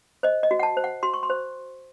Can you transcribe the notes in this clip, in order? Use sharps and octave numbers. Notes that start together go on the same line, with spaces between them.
C5 D#5
D#5
F#4
F#5
A5
C5
F#5
F#4 C6
C#6
C6
C5